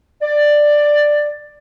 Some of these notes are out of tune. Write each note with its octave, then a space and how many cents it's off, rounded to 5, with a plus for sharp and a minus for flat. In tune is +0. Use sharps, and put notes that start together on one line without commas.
D5 +10